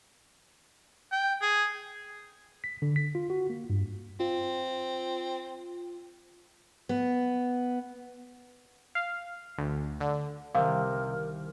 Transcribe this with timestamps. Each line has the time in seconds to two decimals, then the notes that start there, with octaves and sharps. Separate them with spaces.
1.12 G5
1.42 G#4
2.64 B6
2.82 D3
2.96 B6
3.15 F4
3.30 F#4
3.50 A#3
3.70 G2
4.20 C4 F4
6.89 B3
8.95 F5
9.58 D2
10.00 D3
10.55 C2 C3 D#3 A#4 F5